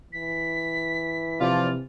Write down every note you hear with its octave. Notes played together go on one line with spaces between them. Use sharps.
E3 B6
C3 F3 F4 D5